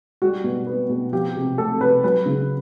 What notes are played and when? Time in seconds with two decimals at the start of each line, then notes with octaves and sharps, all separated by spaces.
0.22 G3 F#4
0.44 B2
0.67 B3
0.89 B2
1.12 F3 G4
1.36 C3
1.58 A3 A4
1.80 C3 B4
2.03 F#3 B4
2.26 C#3